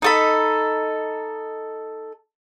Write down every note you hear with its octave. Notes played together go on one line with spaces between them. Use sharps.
D#4 A4 B5